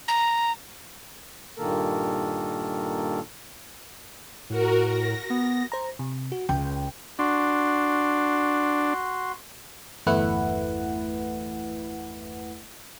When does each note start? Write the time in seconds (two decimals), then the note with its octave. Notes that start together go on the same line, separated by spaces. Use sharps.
0.08 A#5
1.57 G2 A#2 D#3 A#3 A4 A#4
4.50 A2 F#4 A#4
4.86 A#6
5.30 B3
5.72 C5 A#5
5.99 C3
6.32 F#4
6.49 C#2 G5
7.19 D4 F#4 C6
10.07 G1 E2 A3 E4 B4 F#5